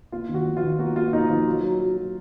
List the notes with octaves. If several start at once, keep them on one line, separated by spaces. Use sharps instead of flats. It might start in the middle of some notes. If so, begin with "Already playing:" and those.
A#3 F4
D#2
F#4
F3
F4
D#2
A#3 F#4
A#3 F4
A#3 D#4
F3 F4
F#3
F#3
F#3
F#3